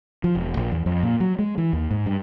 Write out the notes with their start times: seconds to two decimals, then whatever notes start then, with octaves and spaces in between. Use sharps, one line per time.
0.24 F3
0.35 E1
0.57 A#1
0.72 E2
0.86 F2
1.03 A#2
1.20 F#3
1.39 G#3
1.58 E3
1.73 D#2
1.91 G#2
2.06 G2